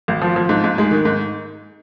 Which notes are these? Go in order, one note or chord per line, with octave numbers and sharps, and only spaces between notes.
G#1
F3
F3
G#2
G#2
G#3
D#3
G#2